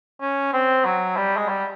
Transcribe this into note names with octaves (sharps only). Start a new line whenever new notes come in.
C#4
C4
F#3
G3
G#3
G3